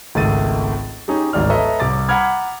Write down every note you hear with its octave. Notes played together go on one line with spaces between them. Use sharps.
G#1 C#2 A3 A6 D#7
C#4 D#4 G4 G#4
D1 G#1 G#2 D5 F6
A4 B4 C#5 D#5 E5 A#5
C2 D6 A6
F#5 A#5 B5 D6 F6 G#6